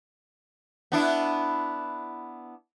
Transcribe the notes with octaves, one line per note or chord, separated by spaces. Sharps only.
B3 D4 E4